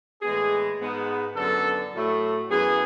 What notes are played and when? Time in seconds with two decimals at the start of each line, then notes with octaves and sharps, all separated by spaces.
0.22 A2 E3 G#3 B3 G#4
0.80 G#2 G#3 B3
1.36 F#2 D3 F#3 B3 A4
1.94 A2 F#3 A3
2.50 F#2 E3 B3 G#4